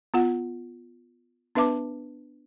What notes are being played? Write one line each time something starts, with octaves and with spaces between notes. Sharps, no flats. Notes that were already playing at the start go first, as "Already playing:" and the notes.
B3 F4 F#5
B3 D4 B4 E5 A5 D6